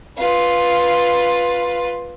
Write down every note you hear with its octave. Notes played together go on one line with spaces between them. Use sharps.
F4 B4